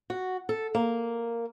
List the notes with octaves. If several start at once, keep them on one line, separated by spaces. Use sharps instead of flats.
F#4
A4
A#3